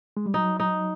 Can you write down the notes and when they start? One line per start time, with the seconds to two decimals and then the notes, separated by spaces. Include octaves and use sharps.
0.17 G#3
0.26 G3
0.34 F#3 D#4
0.60 D#4